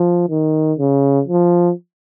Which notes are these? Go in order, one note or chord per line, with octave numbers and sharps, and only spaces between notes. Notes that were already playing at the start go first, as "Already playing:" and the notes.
Already playing: F3
D#3
C#3
F3